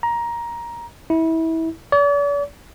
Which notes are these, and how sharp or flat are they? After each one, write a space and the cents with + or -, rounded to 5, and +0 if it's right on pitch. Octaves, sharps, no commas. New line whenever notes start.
A#5 +15
E4 -25
D5 -45